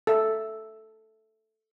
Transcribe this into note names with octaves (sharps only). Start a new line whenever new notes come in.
A4 E5